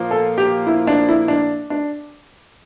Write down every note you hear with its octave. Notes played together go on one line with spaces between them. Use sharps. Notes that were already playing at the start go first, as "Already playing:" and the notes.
Already playing: A#2 F3 A#3
A4
G4
E4
D4
E4
D4
D4